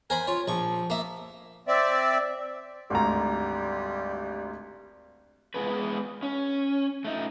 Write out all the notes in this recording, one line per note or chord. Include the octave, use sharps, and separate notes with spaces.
A#4 C5 G#5 B5
F4 C#5
A#1 F3 C#6
A#3 E5
C4 D5 E5
G#1 D2 G3 A#5
G#3 B3 G#4 B4
C#4
A3 D#4